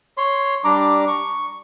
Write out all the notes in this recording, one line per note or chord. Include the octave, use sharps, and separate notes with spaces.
C#5 C6
G3 D4 A#5 D6
C#6